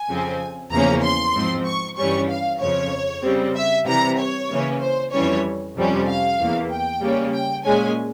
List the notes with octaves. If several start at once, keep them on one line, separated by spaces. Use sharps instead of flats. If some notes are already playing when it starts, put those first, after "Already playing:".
Already playing: G#5
F2 C#3 F3 C4
E2 C#3 F3 A#3 C#4 A#5
C6
G#2 F3 C4
C#6
G2 E3 G3 C#4 C#6
F5
F2 C#3 F3 C#5
C#3 G3 C4
E5
C3 E3 G3 A#5
C#5
C#3 E3 A#3 C#4
C5
F2 E3 G3 C#4 C#5
F2 C3 G3 C#4
F5
E2 E3 A#3
G5
C#3 G3 A#3 C#4
G5
A#2 G#3 C#4 G#5